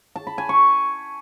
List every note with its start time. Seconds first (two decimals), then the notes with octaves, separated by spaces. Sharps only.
0.16 A5
0.27 B5
0.38 G#5
0.49 C#6